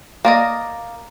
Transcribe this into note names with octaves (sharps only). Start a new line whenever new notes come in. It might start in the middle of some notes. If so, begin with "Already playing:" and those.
A#3 D5 D#5